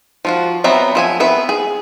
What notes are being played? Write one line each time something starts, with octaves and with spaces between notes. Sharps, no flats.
F3 F4 F#4
F#3 B3 C4 E5 A#5
F3 E5 G#5
B3 C4 B4 E5
G#4